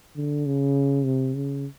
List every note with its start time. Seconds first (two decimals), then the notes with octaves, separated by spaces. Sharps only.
0.16 D3
0.46 C#3
1.05 C3
1.35 C#3